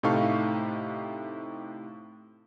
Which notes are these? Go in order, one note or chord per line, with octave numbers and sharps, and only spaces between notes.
A2 C3 D#4 A4 F5 C#6